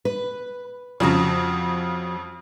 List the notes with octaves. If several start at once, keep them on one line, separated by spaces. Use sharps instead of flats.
B4
F2 C#3 F3 F#4 A#5